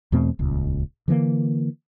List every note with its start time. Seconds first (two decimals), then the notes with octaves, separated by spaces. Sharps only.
0.12 E2 B2 A3 C4
0.39 D#1 C#2
1.08 D3 E3 A3 A#3